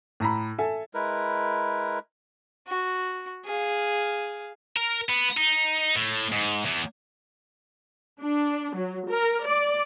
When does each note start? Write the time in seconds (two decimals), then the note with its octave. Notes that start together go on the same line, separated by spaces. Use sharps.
0.20 A2 A#5 B5
0.59 A4 E5 G#5
0.94 G#3 E4 A#4 B4
2.68 F#4
3.45 G#4 F5
4.76 A#4
5.09 B3
5.37 D#4
5.95 A2
6.32 G#2
6.66 E2
8.20 D4
8.76 F#3
9.10 A#4
9.46 D5